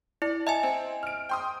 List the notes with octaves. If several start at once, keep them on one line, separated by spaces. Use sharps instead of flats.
E4 D5
D#5 E5 G#5 A5
C4
F6 D7
G5 C6 D#6